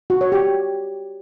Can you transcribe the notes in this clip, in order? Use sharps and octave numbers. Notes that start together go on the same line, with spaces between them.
F#4
C#5
G4